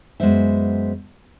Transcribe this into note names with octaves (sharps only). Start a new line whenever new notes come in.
F#2 G#3 B3 C5 E5